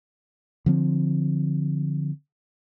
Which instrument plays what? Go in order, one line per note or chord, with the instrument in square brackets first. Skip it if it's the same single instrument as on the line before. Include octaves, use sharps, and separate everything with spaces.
[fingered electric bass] D3 F3 C4